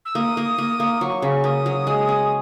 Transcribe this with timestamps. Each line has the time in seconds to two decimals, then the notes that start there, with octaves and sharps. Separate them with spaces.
0.05 E6
0.15 A#3 D#6
0.37 A#3
0.58 A#3
0.80 A#3
1.01 F#3 C#6
1.22 C#3
1.44 A#3 D#6
1.66 F#3
1.87 G#3
2.09 C#4